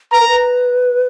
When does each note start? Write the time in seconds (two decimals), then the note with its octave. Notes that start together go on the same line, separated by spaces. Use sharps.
0.12 B4 A#5
0.20 A#4
0.28 B4